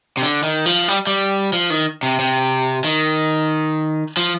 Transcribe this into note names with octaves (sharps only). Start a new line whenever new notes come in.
C3
D3
D#3
F3
G3
G3
F3
D#3
C3
C3
D#3
F3